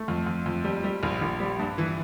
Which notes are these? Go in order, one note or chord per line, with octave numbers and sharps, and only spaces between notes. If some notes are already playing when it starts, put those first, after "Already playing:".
Already playing: A3
F2
F2
F2
G3
G3
A#1
A#1
G3
G2
E3